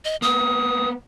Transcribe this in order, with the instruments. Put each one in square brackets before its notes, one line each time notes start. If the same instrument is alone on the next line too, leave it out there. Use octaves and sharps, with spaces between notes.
[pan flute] D#5
[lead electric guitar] A#3 B3 [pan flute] D#6